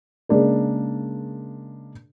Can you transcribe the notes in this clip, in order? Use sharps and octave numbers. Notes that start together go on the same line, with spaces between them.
C#3 G#3 A#3 D4 A#4